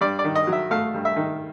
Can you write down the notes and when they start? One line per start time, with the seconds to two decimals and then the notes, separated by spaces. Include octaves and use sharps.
0.01 G2 D5
0.19 D5
0.24 D#3
0.35 D#5
0.47 F#3
0.53 E5
0.71 A3 F5
0.94 G2
1.05 E5
1.16 D#3